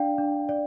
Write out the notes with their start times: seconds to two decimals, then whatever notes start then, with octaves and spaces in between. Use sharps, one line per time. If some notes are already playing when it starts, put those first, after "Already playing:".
Already playing: D4 D5 F5 G5
0.18 D4
0.49 D5